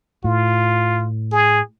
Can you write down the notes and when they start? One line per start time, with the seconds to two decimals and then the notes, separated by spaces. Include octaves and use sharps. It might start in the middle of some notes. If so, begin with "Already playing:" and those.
0.24 A2 F4
1.32 G#4